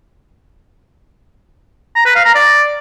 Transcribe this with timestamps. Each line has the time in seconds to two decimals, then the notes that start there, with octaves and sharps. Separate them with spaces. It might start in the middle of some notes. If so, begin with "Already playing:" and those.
1.96 A#5
2.06 B4
2.15 F5
2.25 A#5
2.35 D5